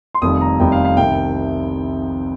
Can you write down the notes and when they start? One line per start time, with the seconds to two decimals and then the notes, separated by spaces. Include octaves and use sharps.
0.15 C6
0.22 F1 F2 D#3 G3 D#6
0.41 A#5
0.59 F1 F2 D#3 G3 G5
0.72 F5
0.85 F5
0.96 C2 C3 D#3 G5